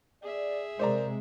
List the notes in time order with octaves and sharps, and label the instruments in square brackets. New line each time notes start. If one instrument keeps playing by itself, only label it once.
[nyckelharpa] G#4 E5 [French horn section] D5
[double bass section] C3 G#3 [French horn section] A#4 [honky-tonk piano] C5 D5 A#5